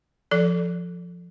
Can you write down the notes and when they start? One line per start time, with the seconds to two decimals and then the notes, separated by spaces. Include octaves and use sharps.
0.31 F3 A4 D5